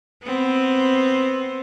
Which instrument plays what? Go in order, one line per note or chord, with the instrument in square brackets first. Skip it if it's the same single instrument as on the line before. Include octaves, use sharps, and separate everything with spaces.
[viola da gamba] B3 C4